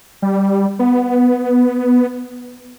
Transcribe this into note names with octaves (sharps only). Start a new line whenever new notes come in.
G3
B3